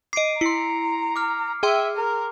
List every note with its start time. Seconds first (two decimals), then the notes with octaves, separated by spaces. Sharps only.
0.13 D#5 D6 C7 D7
0.41 E4 A#5 C6 C#7
1.16 D6 F6
1.63 G#4 E5 G5 C6
1.96 A#4